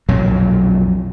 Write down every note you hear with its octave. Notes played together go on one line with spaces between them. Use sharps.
B1 F2 A#2 F#3